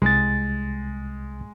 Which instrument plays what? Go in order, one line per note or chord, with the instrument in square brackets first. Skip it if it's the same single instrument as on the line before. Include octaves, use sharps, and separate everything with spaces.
[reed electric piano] C2 A6 [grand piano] G#3